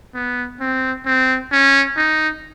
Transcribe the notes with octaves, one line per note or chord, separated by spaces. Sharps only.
B3
C4
C4
C#4
D#4